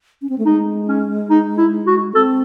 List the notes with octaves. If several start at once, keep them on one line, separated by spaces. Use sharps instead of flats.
C#4
C4
A3
G#3 D#4
C#4
D#4
E4
F#4
C4 A4